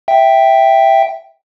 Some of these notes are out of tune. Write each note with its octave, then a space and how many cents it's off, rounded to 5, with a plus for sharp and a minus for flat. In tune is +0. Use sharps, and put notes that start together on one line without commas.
E5 +0 G5 +0